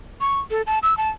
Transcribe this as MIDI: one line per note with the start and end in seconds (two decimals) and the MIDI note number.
0.21 0.40 85
0.51 0.62 69
0.67 0.79 81
0.83 0.97 88
0.97 1.09 81